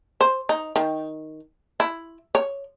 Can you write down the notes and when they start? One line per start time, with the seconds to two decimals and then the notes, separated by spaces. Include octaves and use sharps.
0.21 C5
0.49 D#4
0.76 D#3
1.80 E4
2.35 C#5